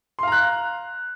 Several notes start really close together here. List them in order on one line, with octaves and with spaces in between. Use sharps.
C6 F5 A#5 F#6